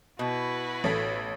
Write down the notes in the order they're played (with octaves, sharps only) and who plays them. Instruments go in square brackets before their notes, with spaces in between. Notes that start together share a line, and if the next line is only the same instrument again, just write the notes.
[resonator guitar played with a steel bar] B2 [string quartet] E4 F#4 B4
[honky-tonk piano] A1 A4 B6